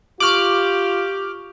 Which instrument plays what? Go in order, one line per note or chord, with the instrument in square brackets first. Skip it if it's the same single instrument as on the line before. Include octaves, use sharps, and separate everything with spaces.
[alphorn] F4 [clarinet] G4 [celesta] C#6 F#7 [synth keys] D6 F6